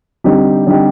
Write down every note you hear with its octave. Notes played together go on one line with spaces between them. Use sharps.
D3 G3 C4 D#4 G4
D3 G3 C4 D#4 G4